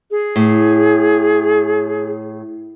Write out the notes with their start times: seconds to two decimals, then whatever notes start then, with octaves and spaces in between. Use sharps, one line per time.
0.11 G#4
0.36 A2